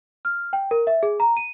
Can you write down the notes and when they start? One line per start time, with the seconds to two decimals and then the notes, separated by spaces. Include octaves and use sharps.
0.25 F6
0.53 G5
0.71 A#4
0.87 E5
1.03 G#4
1.20 A#5
1.37 D#7